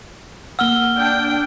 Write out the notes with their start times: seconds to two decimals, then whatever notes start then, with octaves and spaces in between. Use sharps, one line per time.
0.59 A#3 F#5 E6 F6 G7
0.97 D4 G5